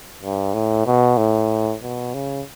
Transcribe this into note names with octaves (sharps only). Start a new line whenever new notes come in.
G2
A2
B2
A2
B2
C#3